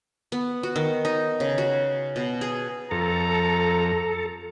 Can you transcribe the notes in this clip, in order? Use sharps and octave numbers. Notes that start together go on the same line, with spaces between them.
B3
F#4
D#3
D#4
C#3
F#4
B2
G#4
F2 A4 A#5